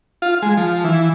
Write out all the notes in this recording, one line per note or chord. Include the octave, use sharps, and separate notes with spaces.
F4
G#3
F3
E3